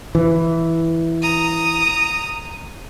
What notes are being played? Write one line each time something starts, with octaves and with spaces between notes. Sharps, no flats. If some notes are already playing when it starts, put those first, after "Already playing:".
E3
A#5 D#6